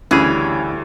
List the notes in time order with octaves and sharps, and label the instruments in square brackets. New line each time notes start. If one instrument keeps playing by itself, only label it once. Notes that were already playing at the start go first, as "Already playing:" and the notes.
[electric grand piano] D2 [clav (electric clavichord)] C#3 E3 G#4 [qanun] G3 E4 [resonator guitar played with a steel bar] C#4